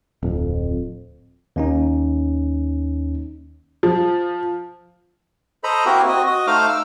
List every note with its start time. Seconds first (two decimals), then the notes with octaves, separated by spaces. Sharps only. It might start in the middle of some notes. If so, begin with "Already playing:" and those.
0.23 D1 F2
1.56 D#2 C#4 D#4
3.83 F3
5.64 A4 C5 D#5 A#5 B5
5.86 A#3 C4 E4 F#4 G4 A#4
6.08 C4 F#4 D#5
6.27 F#4 D#5
6.47 A3 D#4 C5 F5 D6 F6
6.69 E6